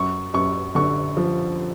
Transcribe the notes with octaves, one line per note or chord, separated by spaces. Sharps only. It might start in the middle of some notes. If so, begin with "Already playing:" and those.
Already playing: F#2 C#6
F#2 C#6
D3 C#6
F3